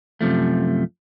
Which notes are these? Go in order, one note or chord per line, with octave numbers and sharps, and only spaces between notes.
F#2 C3 F3 A3